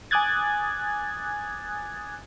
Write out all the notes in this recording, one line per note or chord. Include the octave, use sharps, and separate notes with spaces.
G#5 D6 D#6 F#6 G#6 A6